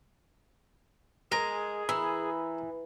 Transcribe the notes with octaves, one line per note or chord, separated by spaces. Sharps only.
G#3 G#4 A#4
E3 A#5 B5 E6